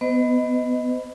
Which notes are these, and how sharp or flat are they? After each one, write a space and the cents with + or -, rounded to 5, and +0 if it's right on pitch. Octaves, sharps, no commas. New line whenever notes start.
B3 +10 C5 -45 D#5 +0